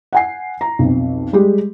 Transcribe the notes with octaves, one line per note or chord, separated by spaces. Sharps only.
F#5 G#5 C7
A#5
B1 F2
G3 G#3 G4